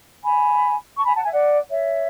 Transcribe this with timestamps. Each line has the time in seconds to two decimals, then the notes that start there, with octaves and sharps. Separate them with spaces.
0.23 G#5 B5
0.96 A5 C#6
1.04 G#5 B5
1.14 F#5 A5
1.23 E5 G#5
1.32 D5 F#5
1.68 C#5 E5